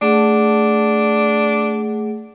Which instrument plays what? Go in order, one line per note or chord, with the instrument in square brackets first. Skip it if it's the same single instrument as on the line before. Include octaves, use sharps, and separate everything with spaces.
[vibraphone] A3 G#4 F#5 [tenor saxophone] D4